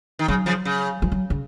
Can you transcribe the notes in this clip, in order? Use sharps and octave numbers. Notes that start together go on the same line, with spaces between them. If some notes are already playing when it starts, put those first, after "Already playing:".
D#3
C#3 F#3
C#3 F3
C#3
F3
F#3
C#3